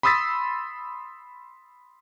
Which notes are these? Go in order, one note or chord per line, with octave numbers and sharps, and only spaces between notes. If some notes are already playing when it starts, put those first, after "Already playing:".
B5 C6 D#6 E6 A6 B6